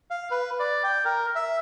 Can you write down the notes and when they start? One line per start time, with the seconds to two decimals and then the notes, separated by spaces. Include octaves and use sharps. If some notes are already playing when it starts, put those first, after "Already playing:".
0.11 F5
0.31 B4
0.60 D5
0.83 G5
1.05 A#4
1.36 E5